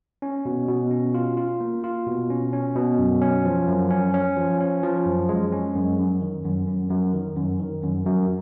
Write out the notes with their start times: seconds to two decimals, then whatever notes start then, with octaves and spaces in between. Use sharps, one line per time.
0.22 C#4
0.45 B2
0.68 B2
0.91 C#4
1.14 F4
1.37 F4
1.61 A#3
1.84 F4
2.06 B2
2.30 C#4
2.53 C#4
2.76 B2
2.98 F#2
3.21 C#4
3.45 F3
3.68 F#2
3.90 C#4
4.14 C#4
4.37 F3
4.60 C#4
4.83 F3
5.06 F#2
5.29 G#3
5.52 C#4
5.75 F#2
5.99 F#2
6.21 D#3
6.44 F#2
6.68 F#2
6.90 F#2
7.13 D#3
7.37 F#2
7.60 D#3
7.83 F#2
8.05 F#2